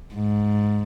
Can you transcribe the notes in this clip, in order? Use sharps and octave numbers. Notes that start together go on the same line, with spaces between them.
G#2